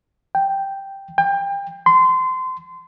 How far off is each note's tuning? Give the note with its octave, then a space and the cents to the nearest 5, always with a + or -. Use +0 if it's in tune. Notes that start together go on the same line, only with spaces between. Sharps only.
G5 +0
G5 +30
C6 -25